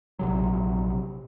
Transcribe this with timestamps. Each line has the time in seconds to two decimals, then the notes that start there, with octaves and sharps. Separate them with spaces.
0.19 A#1 C3 F#3